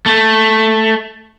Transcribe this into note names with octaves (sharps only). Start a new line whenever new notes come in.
A3